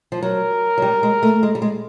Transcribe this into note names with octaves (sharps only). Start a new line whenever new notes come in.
F3
F#3 A#4
F#3
G3
G#3
A3
G#3
G3
G#3